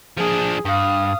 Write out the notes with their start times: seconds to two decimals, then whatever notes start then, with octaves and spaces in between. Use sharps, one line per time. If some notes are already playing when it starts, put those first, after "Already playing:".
0.18 F3 D4 G#4
0.65 G2 F5 D#6